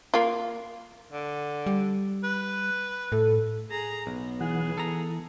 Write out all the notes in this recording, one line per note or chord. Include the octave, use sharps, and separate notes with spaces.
A#3 F4
D3
G3
B4
A2 A4
G#4 A#5
B1 B3
E3 G#4 F#5
E3 A4 A#5